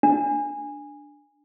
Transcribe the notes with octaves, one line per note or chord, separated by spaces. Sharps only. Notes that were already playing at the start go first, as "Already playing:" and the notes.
D4